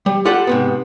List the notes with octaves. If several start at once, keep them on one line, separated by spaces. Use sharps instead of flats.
G3
F4 G4 A4 D5 F#5
G#2 C3 B3